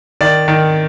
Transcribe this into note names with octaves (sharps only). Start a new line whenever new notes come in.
D#3 D5
D#3